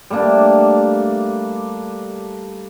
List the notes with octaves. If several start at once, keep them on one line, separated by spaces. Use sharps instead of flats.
G3 A3 A#3 D4